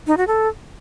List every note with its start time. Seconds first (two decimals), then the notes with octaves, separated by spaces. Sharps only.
0.07 D#4
0.17 F#4
0.27 A4